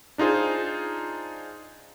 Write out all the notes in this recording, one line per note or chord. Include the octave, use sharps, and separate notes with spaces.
D4 D#4 F4 G#4 C5